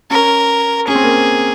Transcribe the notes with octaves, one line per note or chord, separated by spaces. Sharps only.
C#4 A#4
C#4 G#4
C4
A#3
C4